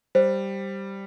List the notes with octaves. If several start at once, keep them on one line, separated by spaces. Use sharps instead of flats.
G3 C5